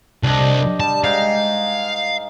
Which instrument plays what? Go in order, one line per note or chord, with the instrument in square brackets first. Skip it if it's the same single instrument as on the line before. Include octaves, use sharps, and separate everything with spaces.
[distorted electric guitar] C2 [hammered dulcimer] D4 G4 D#5
[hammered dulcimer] G3 [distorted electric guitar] A5
[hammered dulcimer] G#2 D#4 G5 [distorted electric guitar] F5